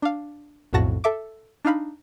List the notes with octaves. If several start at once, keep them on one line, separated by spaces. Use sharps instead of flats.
D4 F5
B1 F2 A2 F#4 A5 A#6
A4 E5 D6
D4 D#4 F5 B5